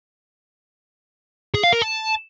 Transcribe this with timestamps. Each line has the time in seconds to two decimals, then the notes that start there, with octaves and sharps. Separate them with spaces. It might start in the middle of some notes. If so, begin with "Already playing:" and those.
1.54 G#4
1.64 F5
1.73 A#4
1.82 A5